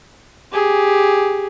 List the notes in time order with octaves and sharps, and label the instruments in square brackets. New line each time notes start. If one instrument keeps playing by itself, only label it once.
[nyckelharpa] G4 G#4